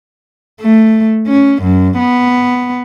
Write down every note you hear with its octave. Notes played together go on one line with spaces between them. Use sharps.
A3
C#4
F#2
B3